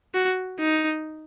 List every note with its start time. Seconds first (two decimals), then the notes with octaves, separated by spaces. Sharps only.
0.14 F#4
0.60 D#4